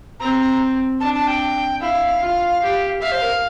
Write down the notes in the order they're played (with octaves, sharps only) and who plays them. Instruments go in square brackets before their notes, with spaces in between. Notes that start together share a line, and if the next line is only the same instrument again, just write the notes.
[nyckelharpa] C4 [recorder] A#5
[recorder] A#5
[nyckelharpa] D4 [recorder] A5
[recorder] A5
G5
[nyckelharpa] E4 [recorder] F5
[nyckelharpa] F4
G4
[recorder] E5 [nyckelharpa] F5
[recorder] C5
A#4